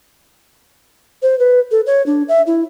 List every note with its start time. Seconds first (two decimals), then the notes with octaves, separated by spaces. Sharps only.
1.22 C5
1.39 B4
1.71 A4
1.87 C#5
2.06 D4
2.29 E5
2.47 E4